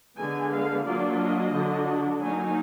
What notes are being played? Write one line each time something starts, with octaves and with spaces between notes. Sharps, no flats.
D3 G#3 B3 G#5
F5
F#3 A#3 D4 F4 D5
D#5
D3 F#3 D4
F#3 A#3 D#4 G#5